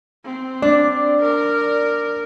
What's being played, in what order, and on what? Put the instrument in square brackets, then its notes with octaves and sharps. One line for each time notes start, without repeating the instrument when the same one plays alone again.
[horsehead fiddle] C4
[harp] D4 [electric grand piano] D5
[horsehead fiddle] A#4